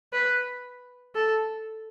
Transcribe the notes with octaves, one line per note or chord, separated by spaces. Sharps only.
B4
A4